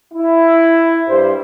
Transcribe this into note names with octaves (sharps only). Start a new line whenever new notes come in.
E4
G2 G3 C5